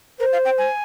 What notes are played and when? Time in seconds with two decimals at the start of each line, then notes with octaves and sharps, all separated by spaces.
0.19 A#4 C5
0.33 F5
0.45 G5
0.58 G#5